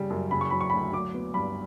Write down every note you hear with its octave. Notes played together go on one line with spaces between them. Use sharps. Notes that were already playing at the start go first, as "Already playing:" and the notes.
Already playing: C#3 G3
F#2
C#3 B5
C#6
F#3 B5
C#6
D2 B5
F#3 D6
B3
G2 B5